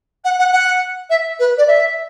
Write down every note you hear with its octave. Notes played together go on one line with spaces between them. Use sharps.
F#5
F#5
F#5
E5
B4
D5
E5